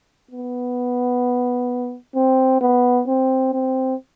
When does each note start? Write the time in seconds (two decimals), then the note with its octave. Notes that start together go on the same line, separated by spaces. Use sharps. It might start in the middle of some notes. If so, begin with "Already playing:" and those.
0.31 B3
2.16 C4
2.61 B3
3.07 C4
3.53 C4